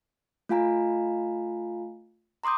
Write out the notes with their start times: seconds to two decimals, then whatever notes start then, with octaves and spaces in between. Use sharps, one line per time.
0.49 A3 F4 F5 G#5 A#5
2.43 A#5 C6 D6 D#6 G6